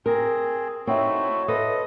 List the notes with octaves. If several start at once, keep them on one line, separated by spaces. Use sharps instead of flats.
C4 G#4 A#4
A3 C4 D#4 E4 F#4 C#5 E5
A4 B4 C5 D#5 D#6